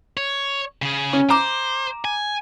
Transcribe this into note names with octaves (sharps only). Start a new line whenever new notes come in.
C#5
C#3 G#4
C#4
C5 A#5 D6
G#5